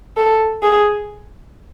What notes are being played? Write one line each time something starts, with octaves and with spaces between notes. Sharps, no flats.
A4
G#4